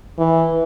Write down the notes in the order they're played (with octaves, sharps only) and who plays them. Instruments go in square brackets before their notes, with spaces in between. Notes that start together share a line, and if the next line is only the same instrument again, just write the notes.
[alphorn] E3